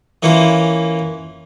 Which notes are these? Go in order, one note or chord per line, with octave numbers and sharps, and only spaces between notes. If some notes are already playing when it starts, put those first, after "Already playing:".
E3 A#3 C#4 F4